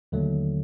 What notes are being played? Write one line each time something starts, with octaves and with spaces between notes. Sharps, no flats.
D#2 D3 F#3 A3